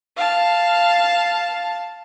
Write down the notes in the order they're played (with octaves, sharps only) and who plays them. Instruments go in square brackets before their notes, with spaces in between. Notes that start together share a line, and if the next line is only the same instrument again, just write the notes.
[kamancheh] F5 A5